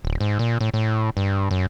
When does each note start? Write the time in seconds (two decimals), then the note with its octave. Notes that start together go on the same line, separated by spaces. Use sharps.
0.05 D1
0.21 G#2
0.39 A#2
0.61 A2
0.74 A2
1.17 G2
1.51 F#2